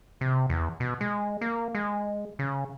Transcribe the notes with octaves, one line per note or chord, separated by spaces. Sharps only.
C3
E2
B2
G#3
A#3
G#3
C#3